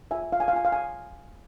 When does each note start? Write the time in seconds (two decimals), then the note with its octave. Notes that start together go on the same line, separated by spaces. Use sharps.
0.11 F4 E5 G#5
0.32 F4 F5
0.40 G#5
0.48 F5
0.53 F4 G#5
0.65 F5
0.72 G#5